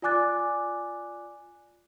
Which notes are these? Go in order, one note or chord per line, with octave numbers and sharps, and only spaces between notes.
F4 D5 G#5 D6 F#6 A6